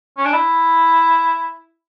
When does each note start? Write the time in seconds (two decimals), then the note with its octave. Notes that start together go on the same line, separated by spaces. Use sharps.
0.17 C#4
0.25 D4
0.33 E4